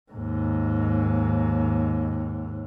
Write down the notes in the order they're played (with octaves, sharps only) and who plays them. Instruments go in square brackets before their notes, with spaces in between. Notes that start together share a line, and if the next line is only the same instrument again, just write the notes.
[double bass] D#2 G#2